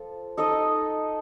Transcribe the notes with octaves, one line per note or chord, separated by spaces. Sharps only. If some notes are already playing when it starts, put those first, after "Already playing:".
Already playing: F3 F4 A4
D#4 A4 D#5